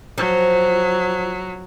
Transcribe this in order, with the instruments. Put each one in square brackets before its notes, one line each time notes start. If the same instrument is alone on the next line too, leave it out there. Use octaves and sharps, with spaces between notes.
[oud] F3 [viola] F#3